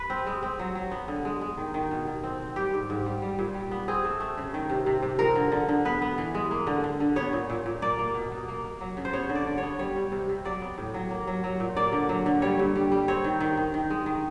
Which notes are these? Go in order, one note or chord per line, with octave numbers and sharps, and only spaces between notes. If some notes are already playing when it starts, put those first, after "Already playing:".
Already playing: B4
C4
G#3
C4
F#3
F#3
B3
D3
G#3
G#3
D#3
D#3
B2
B2
C4
C4
G3 G4
G#2
G#2
G3
G3
A#2
G3
B3
C4 G#4
A3
A3
C#3
D#3
C3
C3
C3
F3 A#4
D3
D3
D3
B3 B4
B3
E3
G#3
A#3
D3
D3
D3
B3 C#5
A#2
A#2
A#2
A#3 D5
A#3
B2
B2
A#3
A#3
F#3
C#3
C5
B3 C#5
D3
D5
D3
C#5
B3
G3 C#5
G3
C3
C3
F#3 D5
B3
A2
F#3
A#3
F#3
F#3
A#2
A#3 D5
D3
F#3
D3
G3 C#5
G2
G3
G3
C4 C#5
D#3
D#3
D#3
D#3
G#3
D#3